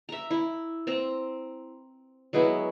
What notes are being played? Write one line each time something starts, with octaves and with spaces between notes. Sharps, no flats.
E5 A#5
E4
C4 A#5
F#3 G#3 B3 E4